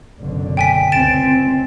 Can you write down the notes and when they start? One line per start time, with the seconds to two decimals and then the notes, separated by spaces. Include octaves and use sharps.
0.21 F#1 B2 D3
0.57 G5 G#5 B6
0.92 C#2 C4 A6 D7 E7